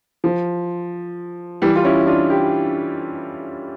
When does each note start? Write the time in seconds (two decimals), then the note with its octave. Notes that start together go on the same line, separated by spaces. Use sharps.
0.24 F3
1.62 E3 G3
1.76 F4
1.85 C#4 E4
2.07 D4 F4
2.30 E4 G4